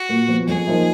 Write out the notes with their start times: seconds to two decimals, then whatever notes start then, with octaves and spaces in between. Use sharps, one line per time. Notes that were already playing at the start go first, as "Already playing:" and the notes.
Already playing: F#4
0.09 A#2
0.28 F3 B3
0.48 F2 G#4
0.67 F3 A#3 D#4